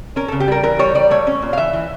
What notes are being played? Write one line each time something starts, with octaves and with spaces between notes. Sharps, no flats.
C#4 A#4
C#3 A4
G4
G3 A#4
E3 A#4
G3 C#5
G3 D5
A3 C#5
C#4
A#2
F5
E3 E5
E3